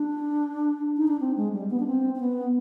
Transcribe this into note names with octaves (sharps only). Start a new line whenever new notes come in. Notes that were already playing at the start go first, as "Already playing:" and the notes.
Already playing: D4
D#4
D4
C4
G#3
G3
B3
D4
C4
C4
B3